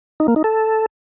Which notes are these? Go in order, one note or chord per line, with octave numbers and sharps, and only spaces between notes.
D#4
A#3
D#4
A4